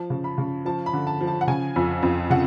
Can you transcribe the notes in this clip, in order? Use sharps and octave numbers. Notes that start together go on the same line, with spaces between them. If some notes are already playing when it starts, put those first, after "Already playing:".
Already playing: F3 A5
C#3
B5
C#3
F3 A5
B5
D3
A5
F3
A5
F#5
C#3 G#5
F2
F2
C#3 F#5